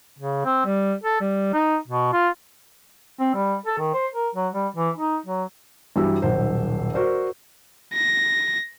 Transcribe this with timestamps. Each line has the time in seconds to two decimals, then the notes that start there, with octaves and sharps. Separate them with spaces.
0.19 C#3
0.45 C4
0.66 G3
1.04 A4
1.20 G3
1.53 D#4
1.88 B2
2.13 F4
3.19 C4
3.35 G3
3.66 A4
3.79 D#3
3.94 C5
4.14 A#4
4.35 F#3
4.53 G3
4.76 E3
4.97 D#4
5.26 F#3
5.96 G2 E3 F#3 G3 E6
6.22 D#1 B1 C5
6.94 F#4 A#4 C5 D5
7.93 A#6